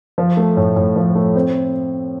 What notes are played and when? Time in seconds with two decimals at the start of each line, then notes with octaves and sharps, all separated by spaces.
0.18 F3
0.37 A3
0.57 A2
0.76 A2
0.96 F3
1.15 A3
1.36 C4